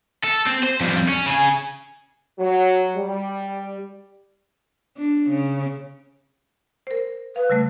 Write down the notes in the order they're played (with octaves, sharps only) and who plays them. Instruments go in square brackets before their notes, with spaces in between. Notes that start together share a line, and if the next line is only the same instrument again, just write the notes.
[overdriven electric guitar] A4
C4
C5
F2 G3
C#4
C#3 G#5
[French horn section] F#3
G3
[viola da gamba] D4
C#3
[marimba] A#4 C5
[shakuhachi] B4 [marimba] F5
[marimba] C#3 G3 A3